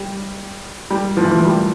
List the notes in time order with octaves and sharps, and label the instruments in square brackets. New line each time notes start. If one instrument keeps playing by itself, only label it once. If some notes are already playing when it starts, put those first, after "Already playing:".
Already playing: [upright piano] G3
G3
F3
E3
F3
G3